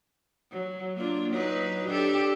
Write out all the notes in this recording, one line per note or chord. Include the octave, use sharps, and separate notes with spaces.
F#3
A#3 D4 F4
F#3 D#4 B4
D4 G4 A4